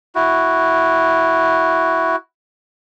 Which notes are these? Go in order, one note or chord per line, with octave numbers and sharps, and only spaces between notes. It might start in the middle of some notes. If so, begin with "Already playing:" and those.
E4 F#4